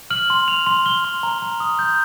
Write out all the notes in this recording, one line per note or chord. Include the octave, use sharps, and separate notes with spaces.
F6 F#7
C6
F6 F7
C6
F6 G7
C6
A#5
A#5
D#6
G6